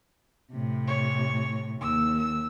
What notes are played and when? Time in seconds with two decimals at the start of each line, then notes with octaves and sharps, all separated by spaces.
0.52 A2 C3
0.88 C#5
1.81 D#2 E6
2.17 E6